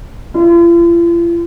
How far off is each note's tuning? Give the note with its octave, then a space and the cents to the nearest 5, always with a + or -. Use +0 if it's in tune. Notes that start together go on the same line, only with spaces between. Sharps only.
F4 -45